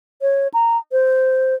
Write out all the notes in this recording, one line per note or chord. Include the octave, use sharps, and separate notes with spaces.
C#5
A#5
C5